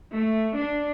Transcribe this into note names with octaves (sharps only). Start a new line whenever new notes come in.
A3
D4